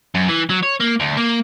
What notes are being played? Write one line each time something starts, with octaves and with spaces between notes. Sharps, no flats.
F#2
E3
F#3
C#5
A#3
D2
A#3